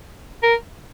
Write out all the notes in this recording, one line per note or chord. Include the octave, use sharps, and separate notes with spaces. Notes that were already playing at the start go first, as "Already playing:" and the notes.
A#4